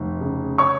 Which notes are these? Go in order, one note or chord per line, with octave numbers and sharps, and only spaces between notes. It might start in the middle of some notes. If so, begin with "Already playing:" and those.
Already playing: F1
C#3
C#5 C#6